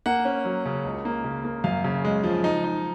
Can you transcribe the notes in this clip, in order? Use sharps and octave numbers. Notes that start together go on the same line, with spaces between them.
A#3 F#5
C#4
F#3
C#3
C#2
A#3
C#3
A#3
F#2 F5
C#3
G#3
F3
D#4
D#4